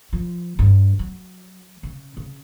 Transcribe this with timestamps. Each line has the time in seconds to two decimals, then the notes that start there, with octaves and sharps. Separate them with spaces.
0.13 F3
0.59 G2
0.99 F#3
1.83 C#3
2.17 C#3